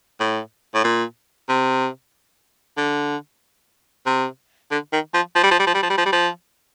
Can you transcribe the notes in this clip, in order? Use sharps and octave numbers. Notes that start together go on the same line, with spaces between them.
A2
A2
A#2
C3
D3
C3
D3
D#3
F3
F3
G3
F3
G3
F3
G3
F3
G3
F3
G3
F3